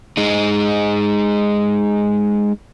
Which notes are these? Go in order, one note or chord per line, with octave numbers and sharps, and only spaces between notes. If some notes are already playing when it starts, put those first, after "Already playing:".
G#3 D#4